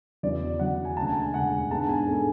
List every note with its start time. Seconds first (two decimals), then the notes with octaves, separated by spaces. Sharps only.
0.23 E2 C#3 F#3 D5
0.59 E2 C#3 F#3 F#5
0.85 G#5
0.96 E1 D2 C#3 A5
1.09 G#5
1.22 G#5
1.34 E1 D2 C#3 F#5
1.70 G#2 G#3 B3 D4 A5
1.89 G#5
2.07 G#2 G#3 B3 D4 A4